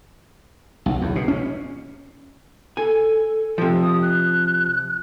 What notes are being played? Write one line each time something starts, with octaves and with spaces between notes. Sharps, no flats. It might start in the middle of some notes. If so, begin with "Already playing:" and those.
B1
E2
B2
C#4
A4 G#5
C3 F3
D#6
F#6